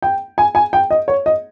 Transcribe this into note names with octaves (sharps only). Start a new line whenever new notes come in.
G5
G#5
G#5
G5
D#5
C#5
D#5